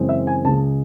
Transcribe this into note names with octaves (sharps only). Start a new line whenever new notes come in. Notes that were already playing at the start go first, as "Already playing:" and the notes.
Already playing: F#2 C#3 E3 G#3 C4
E5
G#5
C#2 C#3 G#3 A5